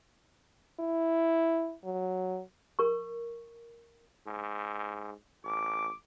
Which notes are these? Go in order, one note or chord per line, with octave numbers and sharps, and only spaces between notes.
E4
F#3
A#4 C#6
G#2
A1 D6